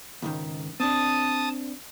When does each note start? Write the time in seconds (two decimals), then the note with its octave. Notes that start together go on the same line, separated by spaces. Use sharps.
0.22 C#2 G#2 D#3
0.80 C4 D4 A5 D#6